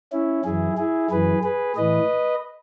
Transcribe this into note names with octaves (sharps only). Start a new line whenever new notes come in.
C#4 E4
F#2 E3 E4 G#4
E4 G#4
F#2 E3 G#4 B4
G#4 B4
A2 E3 B4 D#5